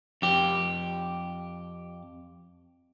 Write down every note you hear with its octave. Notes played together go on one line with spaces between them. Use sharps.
F2 G4